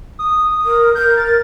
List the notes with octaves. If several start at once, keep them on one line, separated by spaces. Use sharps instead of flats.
D#6
A#4
A#4 G6
A6